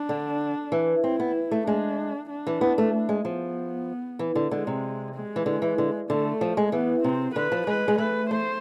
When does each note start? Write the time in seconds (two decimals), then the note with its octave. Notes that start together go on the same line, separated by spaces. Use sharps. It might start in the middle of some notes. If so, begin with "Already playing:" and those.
Already playing: D4
0.09 D3
0.72 E3
1.04 C4 E4
1.20 B3
1.51 A3
1.66 G#3 D4
2.30 D4
2.47 E3
2.61 B3
2.78 A3
3.09 G#3
3.25 F3 B3
4.19 E3
4.36 D3
4.51 D3 G#3
4.67 C3
5.15 G#3
5.36 E3
5.46 D3
5.62 E3
5.78 D3
6.10 D3 A3
6.41 F3
6.57 G#3
6.72 E3 B3
7.03 C3 C4
7.35 D3 B4
7.52 F3
7.67 G#3 B4
7.88 G#3
7.98 A3 B4
8.30 A3 C5